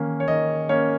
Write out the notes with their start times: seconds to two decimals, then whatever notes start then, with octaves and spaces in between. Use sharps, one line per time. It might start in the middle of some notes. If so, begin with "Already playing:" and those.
Already playing: D#3 A#3 C#4
0.20 C#5
0.28 D#3 D#5
0.69 A#3 C#4 C#5